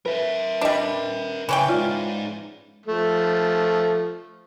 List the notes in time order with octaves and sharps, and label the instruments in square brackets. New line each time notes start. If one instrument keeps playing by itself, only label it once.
[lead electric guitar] A#4 E5 [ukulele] B4
[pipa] G3 D4 [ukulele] B4 D#5 B5
[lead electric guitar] C#3 [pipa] E3 C#4 G5
[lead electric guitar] G#3 D#4 [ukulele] F4 D5
[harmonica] F3 A3